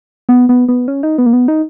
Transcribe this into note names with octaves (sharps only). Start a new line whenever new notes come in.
B3
B3
B3
C#4
D#4
B3
A#3
B3
D#4